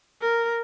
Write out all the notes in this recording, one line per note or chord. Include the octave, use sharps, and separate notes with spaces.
A#4